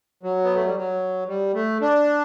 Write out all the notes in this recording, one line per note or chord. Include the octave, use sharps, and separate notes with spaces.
F#3
B3
A3
G3
F#3
G3
A3
D4